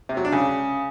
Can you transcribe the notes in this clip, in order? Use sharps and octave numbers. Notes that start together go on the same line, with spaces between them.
C3
F#3
D4
C#3